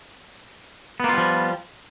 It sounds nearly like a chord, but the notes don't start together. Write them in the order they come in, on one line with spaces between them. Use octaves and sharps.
B3 A#3 F4 G3 F3